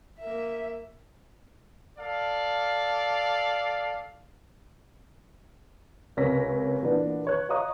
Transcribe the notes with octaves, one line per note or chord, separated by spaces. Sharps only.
A#3 E5
A4 D5 F5
C#2 C3 A#4 C#5 A#6 B6
A#2 E3 B3 D4
B4 C#5 F#6
C#5 D#5 F5 A#5 C#6 D#6